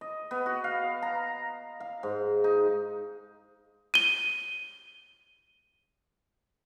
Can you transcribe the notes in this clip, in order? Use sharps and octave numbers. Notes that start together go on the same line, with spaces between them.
D#5
B3
F#4
F5
A#5
F5
G#2
D#4
D#7 G7